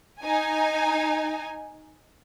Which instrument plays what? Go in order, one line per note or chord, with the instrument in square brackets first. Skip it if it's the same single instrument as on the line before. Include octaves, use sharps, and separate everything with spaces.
[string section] D#4 G#5